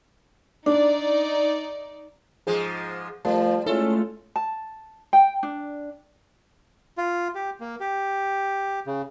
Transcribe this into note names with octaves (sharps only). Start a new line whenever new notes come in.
D4 D#4 D5
G#2 F3 G#3 G#4
F3 G3 A3 A#4 A5
G#3 A3 C#4 E4 F4 A4
A5
G5
D4
F4
G4
A#3
G4
C#3